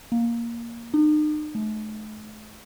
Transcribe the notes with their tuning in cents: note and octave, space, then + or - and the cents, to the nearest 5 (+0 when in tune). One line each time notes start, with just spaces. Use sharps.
A#3 +5
D#4 -40
A3 -40